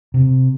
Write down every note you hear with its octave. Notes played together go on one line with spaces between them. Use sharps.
C3